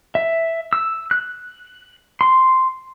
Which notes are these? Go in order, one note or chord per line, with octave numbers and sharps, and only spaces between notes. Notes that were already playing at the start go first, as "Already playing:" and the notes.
E5
E6
F#6
C6